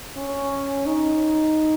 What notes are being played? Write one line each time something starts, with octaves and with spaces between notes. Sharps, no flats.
C#4
D#4